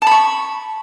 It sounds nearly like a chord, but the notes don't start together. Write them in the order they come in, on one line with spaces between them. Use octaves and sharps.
A5 B5 C#6